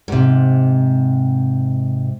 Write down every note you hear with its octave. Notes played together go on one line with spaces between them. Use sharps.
G#2 C3